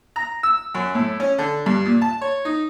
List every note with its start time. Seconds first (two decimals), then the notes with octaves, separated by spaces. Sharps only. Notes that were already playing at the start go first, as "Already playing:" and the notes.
0.16 A#5
0.43 E6
0.75 F#2
0.95 A2
1.20 C#4
1.38 D3
1.66 G2
1.85 A#2
2.02 A5
2.21 C#5
2.45 D#4